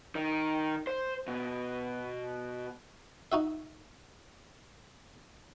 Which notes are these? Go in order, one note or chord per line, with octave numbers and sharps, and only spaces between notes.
D#3
C5
B2
D#4 F#4 E5